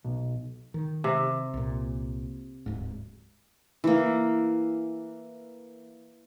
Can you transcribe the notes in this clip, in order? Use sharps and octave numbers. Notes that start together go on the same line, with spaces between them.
B1
D#3
C3
C2 A#2
D1 G#2
E3 A#3